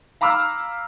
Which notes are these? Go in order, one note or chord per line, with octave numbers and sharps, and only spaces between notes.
F5 A#5 B5 D6 E6 F6